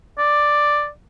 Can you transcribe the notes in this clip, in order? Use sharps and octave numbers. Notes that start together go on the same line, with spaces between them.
D5